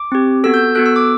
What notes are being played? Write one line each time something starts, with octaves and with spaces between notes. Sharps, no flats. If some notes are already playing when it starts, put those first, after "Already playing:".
Already playing: D6
C4 G4
B3 F#4 A4 E6
G6
B3 F#4 A4 F#6
E6
D6